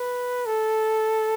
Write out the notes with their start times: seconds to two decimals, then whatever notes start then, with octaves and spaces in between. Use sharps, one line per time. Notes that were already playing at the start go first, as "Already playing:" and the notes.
Already playing: B4
0.46 A4